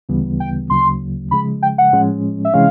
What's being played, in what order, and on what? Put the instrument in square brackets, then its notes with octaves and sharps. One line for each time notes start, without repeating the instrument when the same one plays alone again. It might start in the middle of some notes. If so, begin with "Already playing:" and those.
[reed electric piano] D2 C#3 E3 G3 B3
[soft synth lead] G5
[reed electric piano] D2 C#3 F#3 A#3 [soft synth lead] C6
[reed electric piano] C#3 F3 G#3 [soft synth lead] B5
[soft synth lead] G5
F#5
[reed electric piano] A2 F3 G#3 C#4
[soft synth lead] E5
[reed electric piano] C3 E3 G#3 C#4 [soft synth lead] F5